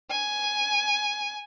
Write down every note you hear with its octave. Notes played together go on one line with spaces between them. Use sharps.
G#5